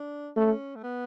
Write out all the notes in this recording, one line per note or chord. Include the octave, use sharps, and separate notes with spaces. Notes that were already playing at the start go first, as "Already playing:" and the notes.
Already playing: D4
A3 C#4
A3
B3